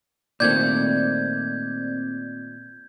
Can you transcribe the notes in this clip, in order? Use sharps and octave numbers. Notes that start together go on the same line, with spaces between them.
A#2 D#3 A3 C4 D5 G6 G#6